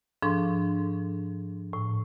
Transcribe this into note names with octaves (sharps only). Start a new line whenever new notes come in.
G#2 F3 D4 A4 C6 C#6
A2